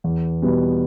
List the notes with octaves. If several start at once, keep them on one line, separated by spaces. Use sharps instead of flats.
E2
B2 G3 B3